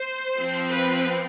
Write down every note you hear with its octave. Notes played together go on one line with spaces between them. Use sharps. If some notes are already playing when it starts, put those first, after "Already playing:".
Already playing: C5
F3 C4
B4